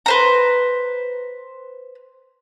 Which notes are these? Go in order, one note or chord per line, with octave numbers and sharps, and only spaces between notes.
B4 C5 A#5